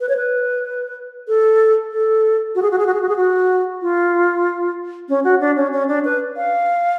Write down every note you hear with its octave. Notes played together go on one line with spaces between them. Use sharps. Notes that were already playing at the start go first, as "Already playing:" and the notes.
B4
C#5
B4
A4
A4
F#4
G#4
F#4
G#4
F#4
G#4
F#4
G#4
F#4
F4
C#4
F#4
D4
C#4
C#4
D4
B4
F5